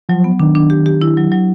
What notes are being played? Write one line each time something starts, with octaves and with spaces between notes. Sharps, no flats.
F3 F#3
B3
D#3 D4
D4
G4
G4
E4
F#3
F#3